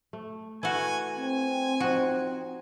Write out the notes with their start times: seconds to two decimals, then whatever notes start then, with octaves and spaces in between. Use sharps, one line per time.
0.13 A3
0.63 E3 A3 F#4 G#5
1.17 C4 G#5
1.80 F3 D#4 F#4